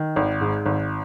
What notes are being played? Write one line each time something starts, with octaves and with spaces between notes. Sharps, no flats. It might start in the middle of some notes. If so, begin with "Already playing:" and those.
Already playing: D#3
G#1
G#2
G#1